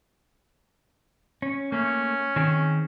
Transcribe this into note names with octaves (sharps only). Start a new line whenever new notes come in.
C#4
A3 A#3 C#4
D#3 C4 G#4